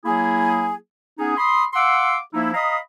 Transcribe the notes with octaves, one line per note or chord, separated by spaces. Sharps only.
F#3 A#3 E4 G#4
B3 C#4 D#4 G#4
B5 C6 D#6
F5 F#5 C6 D6 E6
F3 A#3 D#4 E4
D#5 F5 A#5 B5 D#6